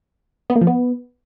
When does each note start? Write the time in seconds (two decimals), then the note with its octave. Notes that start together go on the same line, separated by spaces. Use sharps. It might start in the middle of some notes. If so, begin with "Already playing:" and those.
0.50 B3
0.55 A#3
0.61 F3
0.67 B3